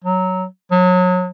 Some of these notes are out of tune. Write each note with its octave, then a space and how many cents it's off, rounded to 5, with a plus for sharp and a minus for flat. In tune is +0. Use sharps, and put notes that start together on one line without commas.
F#3 +5
F#3 -30